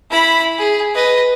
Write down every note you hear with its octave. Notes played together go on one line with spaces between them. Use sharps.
E4 B5
G#4
B4 D#5